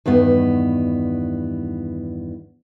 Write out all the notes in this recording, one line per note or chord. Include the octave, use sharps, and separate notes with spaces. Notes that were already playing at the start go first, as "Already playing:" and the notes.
E2 G2 D#3 B3